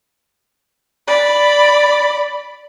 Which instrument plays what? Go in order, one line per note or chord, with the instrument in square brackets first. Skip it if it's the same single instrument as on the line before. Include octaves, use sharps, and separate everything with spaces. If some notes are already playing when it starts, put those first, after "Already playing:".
[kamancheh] D5 B5